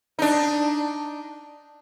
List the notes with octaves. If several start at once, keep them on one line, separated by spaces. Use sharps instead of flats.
D4 D#4